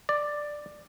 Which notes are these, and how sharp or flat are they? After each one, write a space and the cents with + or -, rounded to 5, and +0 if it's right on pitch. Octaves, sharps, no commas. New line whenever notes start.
D5 +5